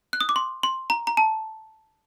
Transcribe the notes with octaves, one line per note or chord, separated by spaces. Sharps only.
F#6
D#6
D6
C6
C6
A#5
A#5
A5